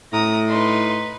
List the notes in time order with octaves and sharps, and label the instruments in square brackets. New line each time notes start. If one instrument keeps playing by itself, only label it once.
[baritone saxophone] A2 [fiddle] A#5 D#6
[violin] D#4 B4 [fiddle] C6